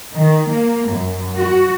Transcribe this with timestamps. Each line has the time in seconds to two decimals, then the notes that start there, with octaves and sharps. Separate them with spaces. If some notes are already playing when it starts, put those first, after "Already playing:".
0.15 D#3
0.48 A#3
0.89 F#2
1.37 F#4